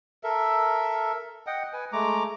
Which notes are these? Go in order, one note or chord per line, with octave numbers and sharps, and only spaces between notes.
A4 A#4 E5
D#5 F#5 G5
B4 G#5
G#3 A3 A#5 D6